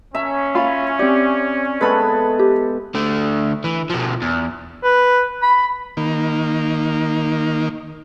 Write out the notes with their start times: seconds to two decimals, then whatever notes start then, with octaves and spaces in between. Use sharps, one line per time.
0.15 C#4 E5 A#5
0.55 F4 F5 B5
0.99 C4 G4 D5
1.81 G#3 B3 A4 B4 B5
2.39 G4
2.95 D3 A3
3.64 E3
3.90 B2 F3
4.22 E2
4.83 B4
5.42 B5
5.97 D#3 A#3